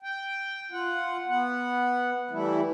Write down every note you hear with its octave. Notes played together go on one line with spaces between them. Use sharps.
G5
F4 F#5
B3 F#5
E3 G3 A3 E4